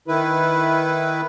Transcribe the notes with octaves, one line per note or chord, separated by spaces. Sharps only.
D#3 E4 B4